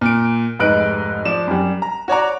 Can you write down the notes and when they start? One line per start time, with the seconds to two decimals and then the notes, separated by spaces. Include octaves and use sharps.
0.01 A#2 D7
0.59 F1 G#2 D#4 B4 F#6 D7
1.25 F3 D5 E7
1.47 F#2 G3
1.82 A#5
2.08 F#4 C#5 D5 A#5